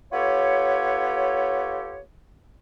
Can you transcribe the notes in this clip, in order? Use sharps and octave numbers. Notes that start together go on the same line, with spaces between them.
B3 F4 G4 A4 C#5